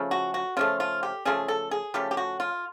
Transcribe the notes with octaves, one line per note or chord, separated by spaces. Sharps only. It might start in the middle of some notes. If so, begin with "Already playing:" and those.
Already playing: C#3 F3 A3
F#4
F#4
C#3 F3 A3 F4
F4
G4
C#3 F3 A3 G#4
A4
G#4
C#3 F3 A3 G4
G4
F#4
F4